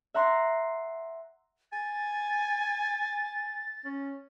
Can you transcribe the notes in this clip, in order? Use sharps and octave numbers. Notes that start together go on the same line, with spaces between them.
E5 F#5 A#5 C6
G#5 A6
C#4